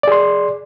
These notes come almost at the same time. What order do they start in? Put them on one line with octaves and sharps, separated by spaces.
D5 G#4 C6